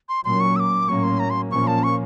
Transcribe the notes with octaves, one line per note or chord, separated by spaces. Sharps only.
C6
A#2 F#3 A#3 C#4 C6
C#6
E6
D6
A2 F#3 A#3 C#4 C#6
C6
A#5
C6
A#2 F3 A#3 C#4 C#6
A5
C#6